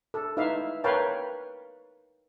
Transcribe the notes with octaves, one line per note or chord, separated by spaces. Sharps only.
A4
D#4 E4 B4 E5 F5
A#4 B4 C#5 F5 G5 A5